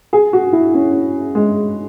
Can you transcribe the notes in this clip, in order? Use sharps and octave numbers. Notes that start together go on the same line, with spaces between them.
G#4
F#4
E4
C#4
G#3